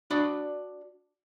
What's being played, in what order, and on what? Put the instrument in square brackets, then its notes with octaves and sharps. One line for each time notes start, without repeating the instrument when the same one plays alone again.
[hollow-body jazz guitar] D4 F#4 D5 B5